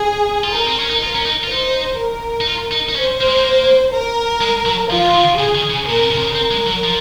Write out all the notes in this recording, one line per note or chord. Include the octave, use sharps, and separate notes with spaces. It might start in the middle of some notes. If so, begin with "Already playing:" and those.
Already playing: G#4
F4
D#4 A#4
C4
C#4
D#4
F4 A#4
C#4
D#4
F4
D#4 C5
A#4
D#4
F4
D#4
D#4
C#4 C5
A#3
G#3
A#3
A#4
G#3
F#3
F3 F4
D#3
C#3 G#4
D#3
C#3
A#2 A#4
C3
C#3
C3
C#3
C4 A#4
G#3
F#3
F3